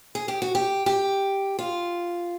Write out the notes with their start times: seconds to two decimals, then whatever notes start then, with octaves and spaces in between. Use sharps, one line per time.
0.15 G#4
0.28 G4
0.42 F#4
0.55 G4
0.86 G4
1.59 F4